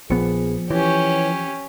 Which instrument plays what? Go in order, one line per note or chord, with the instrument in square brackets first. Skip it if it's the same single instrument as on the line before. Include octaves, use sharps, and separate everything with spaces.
[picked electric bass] A#1 B3 [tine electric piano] F3 C#7 [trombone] G#4
[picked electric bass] E3 [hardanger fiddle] C#4 G4 [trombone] C#5